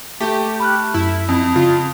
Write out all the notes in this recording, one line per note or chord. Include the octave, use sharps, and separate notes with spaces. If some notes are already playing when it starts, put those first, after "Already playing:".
A3 G4
B5 F6 F#6
F#2 E4
F2
C#3 F4